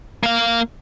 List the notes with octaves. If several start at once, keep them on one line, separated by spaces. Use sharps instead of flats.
A#3 F5